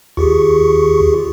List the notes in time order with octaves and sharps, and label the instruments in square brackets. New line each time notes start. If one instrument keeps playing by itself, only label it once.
[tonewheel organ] D#2 C#6 [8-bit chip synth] F4 G4 G#4